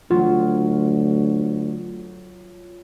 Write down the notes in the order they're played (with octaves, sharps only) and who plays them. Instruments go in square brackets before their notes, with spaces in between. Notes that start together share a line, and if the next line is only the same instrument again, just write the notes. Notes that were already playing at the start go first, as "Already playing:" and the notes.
[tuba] D2 [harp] F#3 [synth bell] F4